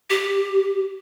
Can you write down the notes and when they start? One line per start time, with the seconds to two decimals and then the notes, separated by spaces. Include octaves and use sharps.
0.10 G4